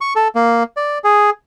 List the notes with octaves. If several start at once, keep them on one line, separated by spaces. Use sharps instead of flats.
C#6
A4
A#3
D5
G#4